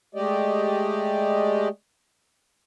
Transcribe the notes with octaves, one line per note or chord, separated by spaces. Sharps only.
G#3 A3 G4 D5 D#5